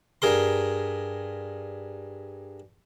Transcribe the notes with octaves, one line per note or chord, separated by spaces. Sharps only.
G2 G#4 A#4 C6